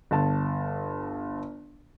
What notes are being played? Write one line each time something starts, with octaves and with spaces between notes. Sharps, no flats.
G1 A5